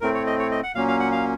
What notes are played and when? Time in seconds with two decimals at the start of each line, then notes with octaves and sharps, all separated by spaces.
0.01 A2 A3 C4 A#4
0.14 C#5
0.27 D#5
0.39 C#5
0.51 D#5
0.63 F#5
0.75 A#2 F#3 A#3 C#4 F5
0.88 F5
1.00 F#5
1.12 F5